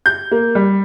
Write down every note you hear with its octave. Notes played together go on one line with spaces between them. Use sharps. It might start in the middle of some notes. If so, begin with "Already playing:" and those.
G6
A#3
G3